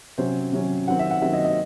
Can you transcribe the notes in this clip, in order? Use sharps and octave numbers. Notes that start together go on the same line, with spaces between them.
C3 F#3 C#4 C5
C3 F#3 C#4
D#3 F#3 C4 F#5
E5
F#5
D#3 F#3 C4 E5
D#5
D#5